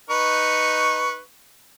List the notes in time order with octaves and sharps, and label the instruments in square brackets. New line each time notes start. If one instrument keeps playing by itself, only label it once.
[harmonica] D#4 B4 C#6